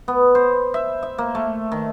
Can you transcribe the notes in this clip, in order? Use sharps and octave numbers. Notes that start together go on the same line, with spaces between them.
B3
C5
E5
E5
A#3
A3
D#3